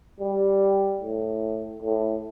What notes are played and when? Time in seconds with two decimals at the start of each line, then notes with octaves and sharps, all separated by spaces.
0.20 G3
1.01 A2
1.82 A2